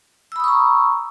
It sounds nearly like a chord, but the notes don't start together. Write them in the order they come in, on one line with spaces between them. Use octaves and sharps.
E6 B5 D#6 C#6 A#5